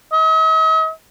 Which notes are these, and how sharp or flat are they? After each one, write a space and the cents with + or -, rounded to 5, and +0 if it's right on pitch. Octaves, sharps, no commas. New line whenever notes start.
D#5 +45